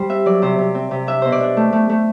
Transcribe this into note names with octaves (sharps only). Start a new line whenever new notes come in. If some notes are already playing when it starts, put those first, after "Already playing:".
Already playing: G3 C5
C4 E5
F#3 D5
C3 C5
C3
C4
C3
D4 E5
B2 C5
D5
D4
A3
A3
A3